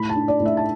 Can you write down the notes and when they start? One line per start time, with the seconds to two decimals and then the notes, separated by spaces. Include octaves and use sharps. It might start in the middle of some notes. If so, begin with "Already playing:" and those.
Already playing: A2 B5
0.09 A5
0.15 D4
0.28 D5
0.40 A2
0.46 E5
0.57 A5